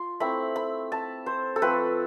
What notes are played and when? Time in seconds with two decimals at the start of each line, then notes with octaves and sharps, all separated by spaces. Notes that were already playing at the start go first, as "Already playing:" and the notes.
Already playing: F4 C6
0.20 A3 C4 E4 B5
0.56 B5
0.92 A5
1.26 C5
1.56 A4
1.62 F3 A3 C4 B4